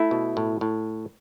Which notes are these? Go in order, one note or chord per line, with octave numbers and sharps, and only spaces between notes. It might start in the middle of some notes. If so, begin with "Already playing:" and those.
Already playing: A3 E4
B2
A2
A2